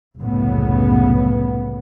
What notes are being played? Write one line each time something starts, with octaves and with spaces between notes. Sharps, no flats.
F#1 C2 A2 C#3 B3